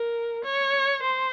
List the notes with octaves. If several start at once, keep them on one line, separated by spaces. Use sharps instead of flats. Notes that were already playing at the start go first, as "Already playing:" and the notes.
Already playing: A#4
C#5
C5